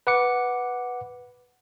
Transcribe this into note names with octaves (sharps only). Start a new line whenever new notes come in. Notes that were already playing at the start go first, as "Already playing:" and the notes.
B4 F#5 D6 C#7